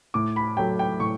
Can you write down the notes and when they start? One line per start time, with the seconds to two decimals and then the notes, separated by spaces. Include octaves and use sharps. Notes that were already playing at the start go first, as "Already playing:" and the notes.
0.14 A2 D6
0.36 B5
0.57 F#3 A3 G5
0.79 G5
1.00 A2 C#6